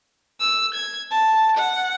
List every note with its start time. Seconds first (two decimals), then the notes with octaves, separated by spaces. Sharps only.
0.40 E6
0.74 G#6
1.11 A5
1.57 F#5